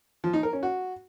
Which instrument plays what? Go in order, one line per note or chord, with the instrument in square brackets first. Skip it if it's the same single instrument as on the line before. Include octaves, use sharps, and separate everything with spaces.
[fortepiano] F3
D#4
A#4
C#4
F#4